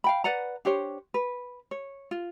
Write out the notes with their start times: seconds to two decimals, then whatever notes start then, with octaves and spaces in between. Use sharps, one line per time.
0.04 F5 G5 B5
0.24 B4 D5 F#5 A#5
0.65 D4 G4 C5 C#5
1.14 B4
1.71 C#5
2.11 F4